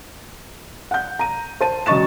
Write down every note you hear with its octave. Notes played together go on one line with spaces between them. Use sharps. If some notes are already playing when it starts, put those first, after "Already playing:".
F#5 G6
A#5 D#7
C5 A5 D#7
E1 C#3 D#5 C#6 A6 E7